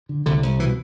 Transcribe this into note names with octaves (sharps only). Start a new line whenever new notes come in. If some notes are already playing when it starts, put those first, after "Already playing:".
D3
C2 D3
C2
B2 E3